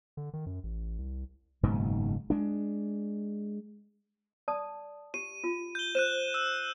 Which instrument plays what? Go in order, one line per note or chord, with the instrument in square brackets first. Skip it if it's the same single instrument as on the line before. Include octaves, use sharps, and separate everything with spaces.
[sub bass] D3
D#3
F#2
A1
C2
[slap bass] F#1 G#2 B2 D#3
G#3 D4
[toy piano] D5 A5 D#6
[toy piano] G4 [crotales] D#7
[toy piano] F4
[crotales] G6 G7
[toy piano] C5 [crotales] F#6 D#7 E7
[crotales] E6